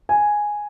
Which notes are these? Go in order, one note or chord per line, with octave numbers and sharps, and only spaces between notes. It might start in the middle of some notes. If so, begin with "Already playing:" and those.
G#5